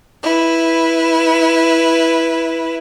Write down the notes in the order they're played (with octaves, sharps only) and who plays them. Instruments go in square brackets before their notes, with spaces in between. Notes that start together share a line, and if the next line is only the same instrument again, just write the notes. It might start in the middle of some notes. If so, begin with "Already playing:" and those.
[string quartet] E4 B4